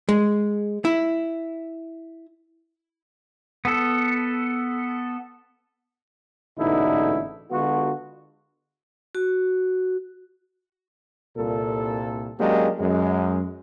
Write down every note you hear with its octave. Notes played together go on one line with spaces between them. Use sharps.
G#3
E4
B3 A4
A1 G#2 B2 D3 D#4 E4
D3 G#3 B3 F4 F#4
F#4
C2 A#2 A4
F#3 G#3 A#3 C#4 D4 G4
F#2 G#3